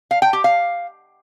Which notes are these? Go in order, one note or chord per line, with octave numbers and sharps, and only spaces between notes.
F5
G5
G4
F5